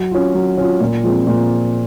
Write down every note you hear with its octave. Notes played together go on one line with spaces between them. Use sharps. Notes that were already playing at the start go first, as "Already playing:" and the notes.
Already playing: F#3
C#4 F4
F#3
C#4 F4
A#2
F3 G#3 C4
A#2